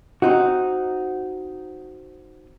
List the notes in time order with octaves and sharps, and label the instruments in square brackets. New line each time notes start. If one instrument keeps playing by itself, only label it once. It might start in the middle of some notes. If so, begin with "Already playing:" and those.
[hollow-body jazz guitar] C4 D#4 F#4